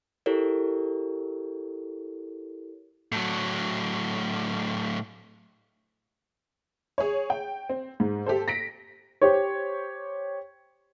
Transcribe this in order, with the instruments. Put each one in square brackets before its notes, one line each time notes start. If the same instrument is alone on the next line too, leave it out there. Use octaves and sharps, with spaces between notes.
[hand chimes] E4 G4 A4 A#4 C#5
[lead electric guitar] A2 F#3
[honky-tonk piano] G#4 C#5
G5
C4
G#2
G4 A4 C5
A#6 B6 D7
[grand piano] G4 C5 C#5